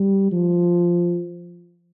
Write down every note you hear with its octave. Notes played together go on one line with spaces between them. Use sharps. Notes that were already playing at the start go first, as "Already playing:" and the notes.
Already playing: G3
F3